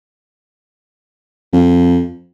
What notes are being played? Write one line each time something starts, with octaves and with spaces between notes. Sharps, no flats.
F2